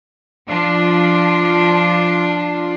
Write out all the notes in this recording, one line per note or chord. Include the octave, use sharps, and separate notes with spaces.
F3 D4 F4